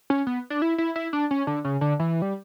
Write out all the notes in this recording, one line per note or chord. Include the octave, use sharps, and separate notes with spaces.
C#4
B3
D4
E4
E4
E4
D4
C#4
D3
C#3
D3
E3
G3